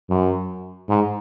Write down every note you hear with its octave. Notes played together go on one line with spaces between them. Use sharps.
F#2
G#2